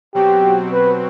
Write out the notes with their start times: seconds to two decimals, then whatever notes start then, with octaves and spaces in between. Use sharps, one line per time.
0.15 B2 F#3 C4 F#4 G4
0.73 B4